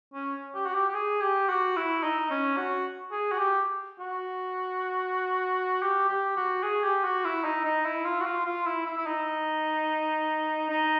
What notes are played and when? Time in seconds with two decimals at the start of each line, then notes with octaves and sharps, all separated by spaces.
0.14 C#4
0.55 G4
0.66 F#4
0.75 G4
0.89 G4
0.94 G#4
1.21 G4
1.49 F#4
1.77 E4
2.03 D#4
2.30 C#4
2.57 F#4
3.12 G#4
3.32 F#4
3.39 G4
4.00 F#4
5.83 G4
6.09 G4
6.37 F#4
6.63 G#4
6.83 G4
7.04 F#4
7.25 E4
7.44 D#4
7.65 D#4
7.86 E4
8.05 F4
8.20 F#4
8.25 F4
8.46 F4
8.66 E4
8.86 E4
8.97 E4
9.07 D#4
10.70 D#4